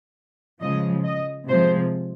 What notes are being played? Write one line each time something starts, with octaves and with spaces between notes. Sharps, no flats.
C#3 F3 G#3 D#5
D#5
C3 F3 G#3 C5